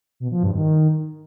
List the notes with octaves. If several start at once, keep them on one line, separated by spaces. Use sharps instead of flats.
B2
F3
G2
D#3